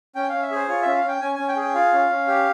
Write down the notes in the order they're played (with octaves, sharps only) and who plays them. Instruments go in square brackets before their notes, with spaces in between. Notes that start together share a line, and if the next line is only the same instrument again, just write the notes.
[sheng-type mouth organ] C#4 G5
C#4 F5
E5
G#4 C5
F4 C#5
C#4 E5
F5
C#4 G5
C#4 G#5
C#4 G#5
G5
G#4
G5
F4 F5
C#4
C#4
G4